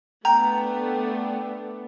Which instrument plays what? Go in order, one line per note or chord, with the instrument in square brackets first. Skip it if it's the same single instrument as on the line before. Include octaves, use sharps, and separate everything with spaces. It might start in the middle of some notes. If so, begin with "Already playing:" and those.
[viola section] A3 B3 D4 [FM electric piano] G5 [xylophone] A#5